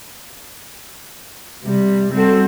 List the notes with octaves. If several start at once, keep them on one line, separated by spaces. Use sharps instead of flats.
C3 G3
G3 C4 F#4 A4